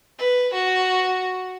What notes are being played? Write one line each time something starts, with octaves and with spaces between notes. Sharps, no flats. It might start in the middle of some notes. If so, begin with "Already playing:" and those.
B4
F#4